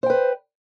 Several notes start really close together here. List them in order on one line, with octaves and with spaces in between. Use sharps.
C5 G5 B4